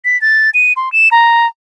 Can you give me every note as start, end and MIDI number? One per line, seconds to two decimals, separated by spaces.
0.05 0.20 95
0.22 0.50 93
0.54 0.73 99
0.77 0.92 84
0.92 1.09 100
1.11 1.47 82